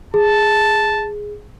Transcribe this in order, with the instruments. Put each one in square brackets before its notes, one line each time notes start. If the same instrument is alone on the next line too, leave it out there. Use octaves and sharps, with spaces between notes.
[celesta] G#4 [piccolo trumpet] A5